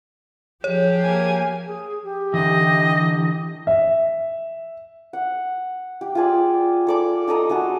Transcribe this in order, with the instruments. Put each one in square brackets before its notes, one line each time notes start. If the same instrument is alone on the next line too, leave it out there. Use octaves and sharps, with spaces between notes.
[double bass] F3 [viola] G4 G#4 [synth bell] C#5
[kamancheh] A#3 G#5
[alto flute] G#4
G4
[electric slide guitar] D3 E3 [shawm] D#5
[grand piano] E5
[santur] F#5
G4
F4 G4 G#4 D5
A4 D5 D6
D#4 A4 D#5 A#5
G#3 D#4 F#4 A4